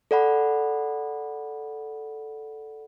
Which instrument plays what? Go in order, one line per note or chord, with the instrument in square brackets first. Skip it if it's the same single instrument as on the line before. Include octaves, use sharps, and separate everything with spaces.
[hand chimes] A4 D5 F#5 B5